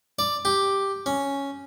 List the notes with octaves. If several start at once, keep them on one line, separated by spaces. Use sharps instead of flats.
D5
G4
C#4